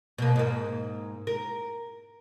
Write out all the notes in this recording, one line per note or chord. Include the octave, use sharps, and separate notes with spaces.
B2 A#3
G#2 A#3
A#4